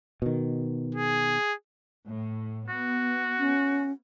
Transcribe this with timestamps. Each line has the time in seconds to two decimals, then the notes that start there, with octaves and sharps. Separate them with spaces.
0.22 B2 D#3
0.95 G#4
2.09 A2
2.69 B3 F#4
3.39 C#4